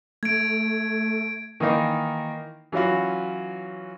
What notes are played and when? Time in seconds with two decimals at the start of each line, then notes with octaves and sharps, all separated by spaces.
0.23 A3 G#6 D7
1.60 D#3 E3 A#3 D#4
2.72 E3 F#3 C#4 F4 F#4